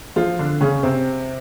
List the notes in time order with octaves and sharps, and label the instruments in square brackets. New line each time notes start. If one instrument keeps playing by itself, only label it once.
[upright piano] F3 F4
D3 D4
C#3 C#4
C3 C4